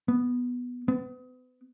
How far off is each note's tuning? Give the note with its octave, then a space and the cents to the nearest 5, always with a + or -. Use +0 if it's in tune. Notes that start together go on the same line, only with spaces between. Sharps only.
B3 -5
B3 +40